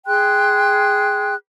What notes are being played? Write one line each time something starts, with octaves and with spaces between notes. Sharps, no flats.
G#4 G5 C6 F#6